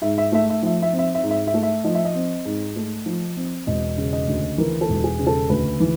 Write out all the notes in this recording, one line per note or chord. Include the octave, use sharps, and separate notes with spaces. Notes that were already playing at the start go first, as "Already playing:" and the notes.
G#2 E5
E5
A3 E5
E5
F3 E5
E5
C4
E5
E5
G#2
E5
E5
A3
E5
F3 D#5
E5
D#5
C4
G#2
A3
F3
C4
E1 D#5
C#3
D#5
D2
E3 A#4
A4
E1
G#4
C#3
A4
D2 B4
E3